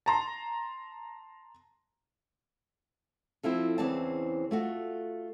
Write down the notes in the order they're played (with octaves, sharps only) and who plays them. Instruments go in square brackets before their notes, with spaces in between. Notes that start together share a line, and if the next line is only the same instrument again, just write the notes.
[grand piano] A5 A#5 C6
[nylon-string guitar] F3 C4 E4 F4 A4
E2 C#3 E3 C4 D5 A5
A3 F4 F#4